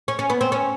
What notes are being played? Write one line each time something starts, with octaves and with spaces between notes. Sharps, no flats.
C#4
C#4
B3
C4
C#4